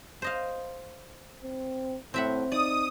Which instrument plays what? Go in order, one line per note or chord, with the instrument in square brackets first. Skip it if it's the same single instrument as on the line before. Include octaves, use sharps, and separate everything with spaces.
[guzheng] C5 D#5 F5
[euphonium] C4
[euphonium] A2 [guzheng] C4 E5 F#5
[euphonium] D#4 [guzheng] D5 [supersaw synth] D#6